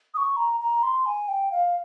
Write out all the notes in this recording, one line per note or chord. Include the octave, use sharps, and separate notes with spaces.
D#6
C#6
A#5
A#5
C6
G#5
G5
F5